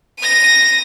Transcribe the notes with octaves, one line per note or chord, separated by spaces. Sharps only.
A#6 D#7